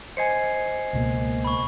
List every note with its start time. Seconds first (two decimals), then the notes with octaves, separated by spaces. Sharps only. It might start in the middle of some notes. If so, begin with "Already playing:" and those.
0.17 C5 D#5 G#5 G#6 C7 C#7
0.93 C#2 B2 A#3
1.45 B5 C#6